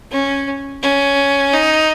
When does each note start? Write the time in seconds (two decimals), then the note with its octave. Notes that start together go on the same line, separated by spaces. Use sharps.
0.11 C#4
0.82 C#4
1.53 D#4